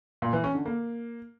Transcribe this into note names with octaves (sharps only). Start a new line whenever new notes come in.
A#2
E3
C#4
D3
A#3